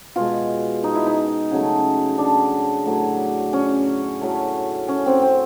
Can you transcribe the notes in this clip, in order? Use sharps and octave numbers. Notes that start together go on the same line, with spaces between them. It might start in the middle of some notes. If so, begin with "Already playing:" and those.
B2 G#3 F4
D#4
E4
D#4
C#3 F#3 A3
D4
A2 F#3 A3
C#4
A2 F#3 A3
C#4
C4
C4